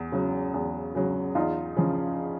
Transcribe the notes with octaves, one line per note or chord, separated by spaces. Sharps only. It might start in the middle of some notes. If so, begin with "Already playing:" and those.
Already playing: E2
C#3 F#3
E2
C#3 F#3
E2 D#4 F4
C#3 F3